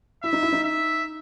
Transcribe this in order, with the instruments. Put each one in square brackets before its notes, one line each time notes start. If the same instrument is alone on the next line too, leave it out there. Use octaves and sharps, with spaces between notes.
[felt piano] E4 [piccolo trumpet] E5
[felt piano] D#4
E4
D#4
[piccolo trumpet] E5